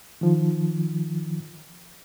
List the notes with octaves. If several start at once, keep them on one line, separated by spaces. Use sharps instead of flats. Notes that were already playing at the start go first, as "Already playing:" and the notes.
D#3 F3